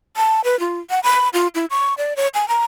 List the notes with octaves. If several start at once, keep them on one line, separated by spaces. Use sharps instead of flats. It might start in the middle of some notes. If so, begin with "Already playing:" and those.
A5
B4
F4
F#5
B5
F4
E4
C#6
D5
C#5
G#5
A#5